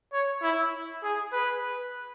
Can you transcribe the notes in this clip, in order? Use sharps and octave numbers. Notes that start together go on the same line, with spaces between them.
C#5
E4
G#4
B4